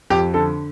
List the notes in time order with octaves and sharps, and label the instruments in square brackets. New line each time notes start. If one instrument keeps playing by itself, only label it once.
[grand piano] F2 G4
D3 A4